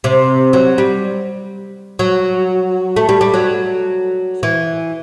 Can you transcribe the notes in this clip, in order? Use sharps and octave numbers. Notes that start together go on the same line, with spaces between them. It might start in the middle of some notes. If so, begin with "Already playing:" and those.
C3
F#3
G3
F#3
A3
G3
G3
F#3
E3